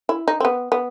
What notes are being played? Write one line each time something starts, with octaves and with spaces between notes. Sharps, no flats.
E4
D#4
C4
B3
B3